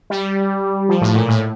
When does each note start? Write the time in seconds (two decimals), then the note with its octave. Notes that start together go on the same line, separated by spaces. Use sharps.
0.10 G3
0.89 F3
1.01 A2
1.15 A#2
1.28 A2